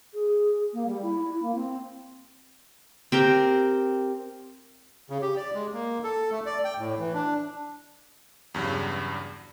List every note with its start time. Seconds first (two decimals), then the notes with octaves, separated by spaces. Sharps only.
0.13 G#4
0.73 A#3
0.86 G3
1.02 E4
1.20 E4
1.42 A#3
1.55 C4
3.12 C4 G4 A#4
5.10 C#3
5.22 G4
5.37 D5
5.54 G#3
5.73 A#3
6.04 A4
6.31 A3
6.46 D5
6.64 G5
6.78 A2
6.99 E3
7.14 D4
8.54 E2 G2 C#3 F#3